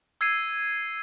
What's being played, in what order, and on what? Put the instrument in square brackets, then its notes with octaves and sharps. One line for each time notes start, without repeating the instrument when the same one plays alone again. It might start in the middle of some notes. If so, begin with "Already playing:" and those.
[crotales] E6 G#6 C7 D#7